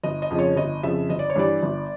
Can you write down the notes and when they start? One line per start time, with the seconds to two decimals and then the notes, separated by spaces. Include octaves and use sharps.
0.03 G1 D#5
0.22 D#5
0.30 F2 C#3 F3
0.39 C#5
0.57 G1 D#5
0.83 F2 C#3 F3 E5
1.09 G1 D#5
1.19 D5
1.30 C#5
1.36 G2 E3 G3 D5
1.63 G1